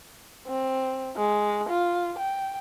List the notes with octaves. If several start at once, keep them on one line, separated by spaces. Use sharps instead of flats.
C4
G#3
F4
G5